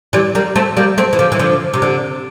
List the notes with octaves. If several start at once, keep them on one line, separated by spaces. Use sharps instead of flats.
E3 G3
G3 A#3
A3 C4
G3 A#3
A3 C4
E3
D3 F3
E3
D3 F3
C3
D3